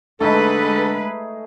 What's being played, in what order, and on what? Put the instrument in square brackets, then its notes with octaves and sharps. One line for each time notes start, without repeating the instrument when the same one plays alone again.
[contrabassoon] D3 [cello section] G#3 B4 [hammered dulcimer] A3 D#4 G#4 [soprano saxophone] A4